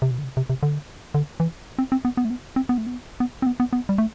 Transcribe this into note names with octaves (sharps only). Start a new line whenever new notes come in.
C3
B2
D3
C3
C3
C3
D3
D3
E3
C4
C4
B3
B3
A3
B3
C4
B3
A3
B3
B3
C4
B3
B3
B3
G3
A3